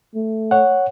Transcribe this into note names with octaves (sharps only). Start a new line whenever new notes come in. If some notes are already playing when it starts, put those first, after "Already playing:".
A3
C#5 F#5